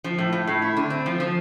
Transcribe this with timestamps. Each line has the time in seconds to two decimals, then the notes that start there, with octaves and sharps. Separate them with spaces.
0.04 F3
0.18 A2
0.33 A2
0.47 A2
0.62 E4
0.77 D3
0.90 C4
1.06 F3
1.20 F3